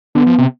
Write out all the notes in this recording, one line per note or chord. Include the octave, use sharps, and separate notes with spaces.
D3 B3
F3
C3